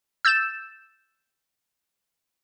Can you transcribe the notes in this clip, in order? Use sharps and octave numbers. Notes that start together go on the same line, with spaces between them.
E6 G6 A6 E7